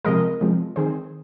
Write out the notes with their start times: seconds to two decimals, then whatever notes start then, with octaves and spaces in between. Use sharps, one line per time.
0.05 C3 F3 G#3 A#4 D#5
0.41 C3 F3 G#3
0.76 D#3 C4 G#4 C5